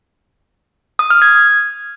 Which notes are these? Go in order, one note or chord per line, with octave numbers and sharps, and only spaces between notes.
D#6
F6
G#6